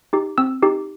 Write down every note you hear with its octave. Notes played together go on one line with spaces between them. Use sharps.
D#4 G4
C4 E6
D#4 G4